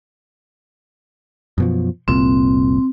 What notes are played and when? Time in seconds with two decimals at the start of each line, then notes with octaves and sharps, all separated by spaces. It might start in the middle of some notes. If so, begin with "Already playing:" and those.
1.58 F#2 B2 F3
2.08 F1 C2 A#2 C4